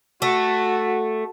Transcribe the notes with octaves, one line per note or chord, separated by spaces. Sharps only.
A3 F#4